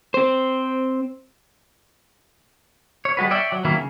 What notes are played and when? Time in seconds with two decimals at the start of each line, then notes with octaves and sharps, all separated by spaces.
0.14 C4 C5
3.05 C#5
3.17 G3 G#3 F#4 B4
3.31 C#5 D5 E5 G5
3.52 F#3
3.65 D#3 E3 F#3 A#3 E4
3.76 C#3